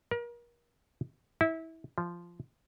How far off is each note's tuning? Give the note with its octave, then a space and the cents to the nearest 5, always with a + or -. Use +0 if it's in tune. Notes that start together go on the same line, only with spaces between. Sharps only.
A#4 +35
E4 -25
F3 -10